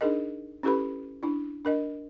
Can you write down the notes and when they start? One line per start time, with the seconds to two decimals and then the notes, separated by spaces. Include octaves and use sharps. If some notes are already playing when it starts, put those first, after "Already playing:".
0.01 D4 D#4 G#4 A#4 D#5
0.63 C#4 E4 G4 A4 B4 B5
1.23 D4 E4
1.65 D4 A#4 D#5